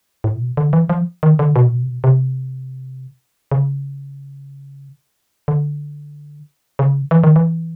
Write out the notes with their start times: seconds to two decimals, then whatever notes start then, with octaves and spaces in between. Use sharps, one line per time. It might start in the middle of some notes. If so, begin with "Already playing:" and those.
0.24 A2
0.36 A#2
0.40 B2
0.57 D3
0.73 E3
0.89 F3
1.23 D#3
1.39 D3
1.56 B2
1.67 A#2
1.72 B2
1.82 C3
1.88 B2
2.04 C3
3.51 C#3
5.48 D3
6.79 C#3
7.11 E3
7.24 D#3
7.36 E3